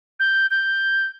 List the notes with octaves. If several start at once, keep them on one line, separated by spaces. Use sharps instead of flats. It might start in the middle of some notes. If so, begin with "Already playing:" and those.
G6
G6